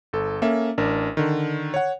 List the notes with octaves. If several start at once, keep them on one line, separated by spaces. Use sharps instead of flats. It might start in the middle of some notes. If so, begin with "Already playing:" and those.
G1 A4
A#3 C#4 A4 E5
A1 D4 A#4
D3 D#3
C#5 F#5